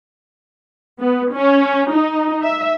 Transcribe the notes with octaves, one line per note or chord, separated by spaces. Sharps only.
B3
C#4
D#4
E5